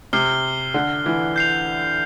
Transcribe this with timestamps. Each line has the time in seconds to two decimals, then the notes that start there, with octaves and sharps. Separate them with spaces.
0.13 C3 F6 C7 G7
0.74 D3
1.06 E3
1.36 G6 C7 F7